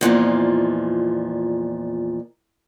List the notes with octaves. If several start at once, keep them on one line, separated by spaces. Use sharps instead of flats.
E2 A#2 F3 G#3